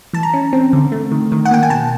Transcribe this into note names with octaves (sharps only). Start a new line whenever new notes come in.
E3 A5
A#5
C#4
C4
D3
A3
D#3
D#3
F#5
A#3 G5
G#5
B2 A5